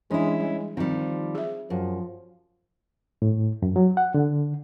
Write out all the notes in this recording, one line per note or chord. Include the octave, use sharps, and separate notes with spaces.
E3 G#3 C#4 D4 E4
G3 G#3
D#3 F3 G3 C4
G#4 E5
F#2 F3
A2
F#2
F#3
F#5
D3